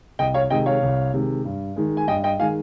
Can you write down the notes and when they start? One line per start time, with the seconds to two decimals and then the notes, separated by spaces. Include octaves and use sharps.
0.19 C2 D#5 G5
0.34 C#5 F5
0.50 C3 D#3 G#3 D#5 G5
0.66 C#5 F5
0.83 C2
1.14 C3 D#3 G#3
1.45 G2
1.76 D#3 G#3
1.97 G#5
2.08 G2 D#5 G5
2.24 D#5 G5
2.39 D#3 G#3 F5 G#5